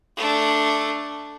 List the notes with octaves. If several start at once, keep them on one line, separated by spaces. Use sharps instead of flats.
A3 D4